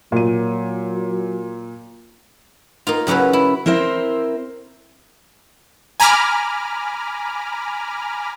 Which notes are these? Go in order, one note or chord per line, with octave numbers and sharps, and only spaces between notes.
A#2 F#3 D#7
A#3 D#4 F4
C#3 F#3 C#4 E4 B4
E4
C4 E4 A#4 C5 E5
G#5 A#5 B5 D6 F6